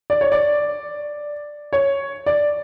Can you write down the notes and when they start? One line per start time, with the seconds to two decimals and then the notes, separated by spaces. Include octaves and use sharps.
0.10 D5
0.21 C#5
0.32 D5
1.73 C#5
2.26 D5